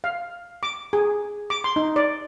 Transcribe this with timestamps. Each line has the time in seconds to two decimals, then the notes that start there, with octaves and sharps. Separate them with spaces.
0.04 F5
0.63 D6
0.93 G#4
1.50 D6
1.64 C6
1.76 D#4
1.96 D5